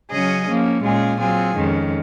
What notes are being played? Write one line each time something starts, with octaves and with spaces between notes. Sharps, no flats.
C#3 F#3 C#4 G#4 D#5
F3 A#3 C#4
A#2 G#3 C#4 F4 G#4
F#3 C4 F4 G#4
F2 D#3 G#3 C#4